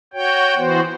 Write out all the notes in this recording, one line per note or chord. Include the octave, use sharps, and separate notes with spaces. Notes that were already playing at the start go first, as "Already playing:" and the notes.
F#4 C#5 G5
E3 B3 F#4 C5